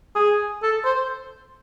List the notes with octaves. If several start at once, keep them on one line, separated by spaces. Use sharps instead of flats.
G#4
A4
C5